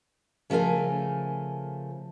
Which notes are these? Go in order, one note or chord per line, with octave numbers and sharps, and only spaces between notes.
C#3 F3 A3 A#4 G#5